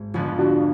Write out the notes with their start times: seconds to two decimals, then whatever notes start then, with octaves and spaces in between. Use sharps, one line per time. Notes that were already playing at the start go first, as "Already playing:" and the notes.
Already playing: G#1
0.14 F1 F2 D3 F3 B3 F4
0.39 D4 F#4